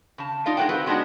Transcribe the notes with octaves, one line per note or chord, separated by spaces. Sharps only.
C#3 A5
D#4 F4 D5 F5
G#3 A#3 B4 D5 F#5 G5
C4 F#4 B4
F#3 G#3 B3 D4 D#4 F#4